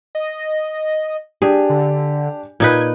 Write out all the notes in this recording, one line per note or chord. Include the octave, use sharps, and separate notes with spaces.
D#5
D4 G4 G#4
D3
A#2 D#4 B4 G#6